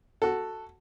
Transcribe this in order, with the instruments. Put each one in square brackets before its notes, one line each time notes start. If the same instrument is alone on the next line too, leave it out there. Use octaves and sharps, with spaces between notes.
[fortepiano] F#4 A4